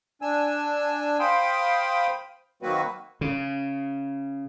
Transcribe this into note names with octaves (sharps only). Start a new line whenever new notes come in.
D4 G#5 E6
C5 F5 G5 B5 C6 D#6
D#3 F#3 A#3 C4 F#4 B4
C#3